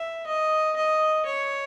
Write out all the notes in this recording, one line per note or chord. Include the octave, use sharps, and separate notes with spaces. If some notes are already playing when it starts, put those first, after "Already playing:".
Already playing: E5
D#5
D#5
C#5